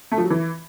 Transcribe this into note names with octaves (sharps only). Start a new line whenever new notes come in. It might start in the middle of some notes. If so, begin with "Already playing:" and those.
A3
F3
F#3
E3